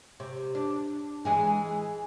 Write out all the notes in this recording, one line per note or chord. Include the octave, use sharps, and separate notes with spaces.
C3
D4
E3 G#3 G#4